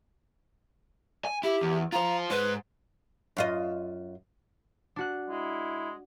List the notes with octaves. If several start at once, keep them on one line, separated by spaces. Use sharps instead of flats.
G#5
E4 G4
E2
F4 C5 A#5
G#2 B4 C5
F#2 F4 D#5
D4 F#4 F#6
G#3 E4